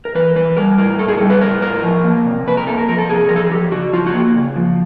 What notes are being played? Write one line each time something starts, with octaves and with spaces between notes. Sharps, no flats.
A#4
E3 B4
E3 B4
G3 A#4
A2 A#4
A2 A4
G#4
G3 A4
B4
A2 A#4
A2 A#4
F3
A#3
C3
C3 B4
A#4
A#3 A4
A#4
F3 A#4
A4
C3 G#4
F3 A#4
A4
G#4
F3 G4
C#3 F#4
F3 F4
F#4
A#3
C#3
F3